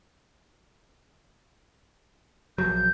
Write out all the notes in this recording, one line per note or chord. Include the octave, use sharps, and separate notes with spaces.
A#1 F3 F#3 G6